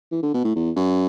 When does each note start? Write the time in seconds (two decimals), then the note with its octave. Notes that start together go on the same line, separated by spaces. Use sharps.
0.12 E3
0.23 D3
0.34 B2
0.44 A2
0.56 E2
0.76 F#2